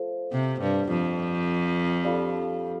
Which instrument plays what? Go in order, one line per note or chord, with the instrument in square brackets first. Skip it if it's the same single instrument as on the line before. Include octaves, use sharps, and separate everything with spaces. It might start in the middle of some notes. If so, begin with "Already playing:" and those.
Already playing: [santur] F3 A3
[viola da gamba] C3
G2
F2
[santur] G3 D4 F4 A4